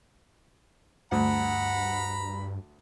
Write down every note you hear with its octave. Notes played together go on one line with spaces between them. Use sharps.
D2 G2 F#5 A#5 B5